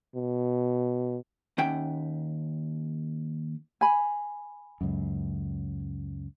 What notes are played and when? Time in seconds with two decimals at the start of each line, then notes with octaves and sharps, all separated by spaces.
0.15 B2
1.58 D#2 C#4 E5 F#5 G5
3.81 G#5 B5
4.81 C#2 F#2